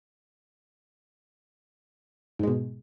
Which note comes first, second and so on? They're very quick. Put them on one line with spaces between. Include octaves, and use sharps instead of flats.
G#2 G#3 B2